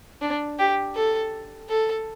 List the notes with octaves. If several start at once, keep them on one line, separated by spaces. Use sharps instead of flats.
D4
G4
A4
A4